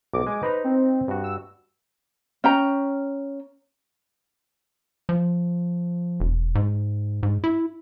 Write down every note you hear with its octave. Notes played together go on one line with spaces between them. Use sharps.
B1 D6
G#3 G#5
D#4 B4 C5 A#5
C4
G2 F#4
E6
C#4 G5 A#5
F3
E1
G#2
G#2
E4